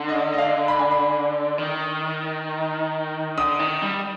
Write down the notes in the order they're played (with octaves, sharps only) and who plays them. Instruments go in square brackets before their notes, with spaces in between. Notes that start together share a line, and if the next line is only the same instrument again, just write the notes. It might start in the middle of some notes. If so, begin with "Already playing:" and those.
Already playing: [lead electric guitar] D3
[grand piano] D#5
D#5
F5
B5
G#5
B5
[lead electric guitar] D#3
[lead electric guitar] D3 [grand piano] D#6
[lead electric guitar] D#3
G3